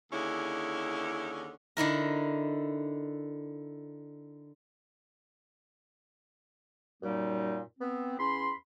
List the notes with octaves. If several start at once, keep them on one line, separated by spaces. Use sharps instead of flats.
D#2 D3 C#4 E4 G#4
D3 D#4 E4 A#4
F#2 A#2 G3 A#3 D#4
B3 C4
E2 C#4 B5 C6